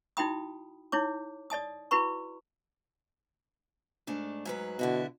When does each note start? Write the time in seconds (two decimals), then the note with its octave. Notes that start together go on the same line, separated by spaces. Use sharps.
0.17 D#4 E4 F#4 G5 B5 D#6
0.92 D#4 E4 C#5 D6
1.50 D5 D#5 A5 D#6
1.91 E4 F#4 B4 B5 C#6
4.07 G#2 A3 D4
4.45 G#2 F#3 B4
4.79 B2 D3 E4 F#4